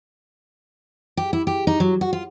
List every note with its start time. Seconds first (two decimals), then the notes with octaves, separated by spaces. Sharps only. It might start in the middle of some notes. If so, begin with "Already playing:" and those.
1.17 G4
1.33 E4
1.47 G4
1.67 D#4
1.80 F#3
2.01 F#4
2.13 F4